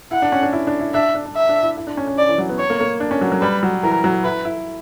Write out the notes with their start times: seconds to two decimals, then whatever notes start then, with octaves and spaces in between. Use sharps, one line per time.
0.11 E4 F#5
0.22 D4
0.32 C#4
0.43 D4
0.53 E4
0.67 D4
0.80 E4
0.94 D4 E5
1.15 D4
1.26 D4
1.36 E5
1.49 D4
1.62 E4
1.77 E4
1.87 D4
1.97 C#4
2.07 C#4
2.18 D5
2.29 E3
2.38 F#3
2.49 B3
2.59 C#5
2.70 A#3
2.80 A#3
3.00 D4
3.11 C#4
3.21 F#3
3.32 F#3
3.41 G3 B4
3.63 F#3
3.83 E3 A#4
4.04 F#3
4.24 E4 B4
4.45 E4